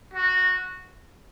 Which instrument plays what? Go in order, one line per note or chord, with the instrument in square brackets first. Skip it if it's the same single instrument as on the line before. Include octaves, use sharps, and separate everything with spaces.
[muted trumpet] F#4